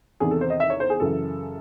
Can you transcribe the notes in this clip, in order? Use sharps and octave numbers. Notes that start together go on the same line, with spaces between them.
E2 C3 D#3 G#4
A4
C5
D#5
E5
C#5
C5
G#4
F#2 C#3 E3 A4